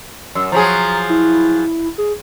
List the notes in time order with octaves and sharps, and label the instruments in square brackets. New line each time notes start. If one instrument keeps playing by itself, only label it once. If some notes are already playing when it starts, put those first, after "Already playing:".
[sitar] F#2 [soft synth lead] E6
[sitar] F3 F#3 G#4 [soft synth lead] A#5
[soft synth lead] E4
G#4